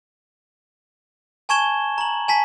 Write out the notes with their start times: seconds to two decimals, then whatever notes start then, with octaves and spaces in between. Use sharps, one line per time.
1.49 G#5 A5 C#6 G#6 E7 G7
1.98 A#5 F#7
2.28 G#5 A5 B6